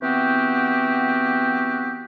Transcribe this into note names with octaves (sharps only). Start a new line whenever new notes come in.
E3 B3 C4 F#4 G4